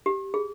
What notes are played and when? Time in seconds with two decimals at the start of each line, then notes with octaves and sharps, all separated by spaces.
0.06 G4
0.34 G#4